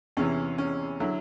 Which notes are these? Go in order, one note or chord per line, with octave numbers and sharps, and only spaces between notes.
E2 C3 E3 C#4
C#4
D3 F#3 E4